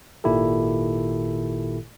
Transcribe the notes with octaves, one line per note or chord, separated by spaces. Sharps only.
G#1 A#2 D#3 E4 G4 A4